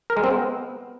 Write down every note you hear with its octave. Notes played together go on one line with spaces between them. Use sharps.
A#4
G#3
C4
B3